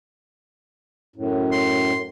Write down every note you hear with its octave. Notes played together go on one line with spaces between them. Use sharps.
F#2 A2
C6